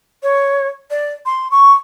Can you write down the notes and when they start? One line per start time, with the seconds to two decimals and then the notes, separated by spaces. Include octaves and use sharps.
0.23 C#5
0.90 D5
1.26 C6
1.51 C#6